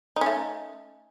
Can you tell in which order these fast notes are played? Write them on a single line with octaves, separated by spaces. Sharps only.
D#4 C#4 A3